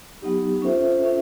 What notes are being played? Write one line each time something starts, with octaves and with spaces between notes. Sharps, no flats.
F#3 B3 D#4 G4
C#4 F4 A4 C5 E5
C#4 F4 A4 C5 E5